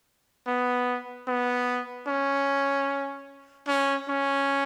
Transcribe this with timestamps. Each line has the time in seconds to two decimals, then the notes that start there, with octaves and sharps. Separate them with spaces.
0.47 B3
1.27 B3
2.07 C#4
3.68 C#4
4.09 C#4